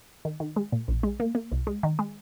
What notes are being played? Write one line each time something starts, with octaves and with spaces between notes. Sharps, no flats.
D#3
D#3
G#3
A#2
A#1
G#3
A#3
A#3
C2
G#3
D#3
G#3